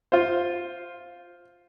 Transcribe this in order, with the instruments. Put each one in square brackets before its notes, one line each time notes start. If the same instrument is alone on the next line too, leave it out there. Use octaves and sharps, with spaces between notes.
[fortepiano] F4 C5